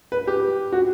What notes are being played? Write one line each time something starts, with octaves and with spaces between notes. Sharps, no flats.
B4
G4
F#4